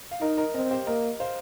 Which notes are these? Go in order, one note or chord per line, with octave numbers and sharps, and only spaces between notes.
F5
D#4 A#4 D#5
A#4 D#5
C4 A#4 D#5
G4 C5
A#3 A#4 D#5
C5 F5